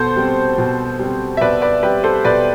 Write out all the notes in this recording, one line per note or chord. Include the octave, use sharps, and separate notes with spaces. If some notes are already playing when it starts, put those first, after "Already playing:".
Already playing: B2 A4 C5
G3 C4
B2
G3 C4
E5
B2 B4 D5
B4 D5
G3 C4 G4 B4
A4 C5
B2 B4 D5